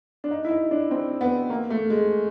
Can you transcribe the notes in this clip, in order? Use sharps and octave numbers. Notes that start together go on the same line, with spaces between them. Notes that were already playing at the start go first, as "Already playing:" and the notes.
D4
D#4
E4
D#4
D4
C4
B3
A#3
A3
G#3